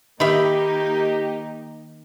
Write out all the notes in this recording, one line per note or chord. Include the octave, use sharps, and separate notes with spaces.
D#3 A#3 D#4 G4 E5 F5 B5